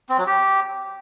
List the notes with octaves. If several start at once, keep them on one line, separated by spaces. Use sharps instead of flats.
C4
F#3
G4